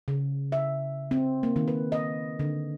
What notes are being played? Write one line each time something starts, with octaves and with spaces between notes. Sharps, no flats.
C#3
E5
C4
A#3
D#3
B4
D#5
D3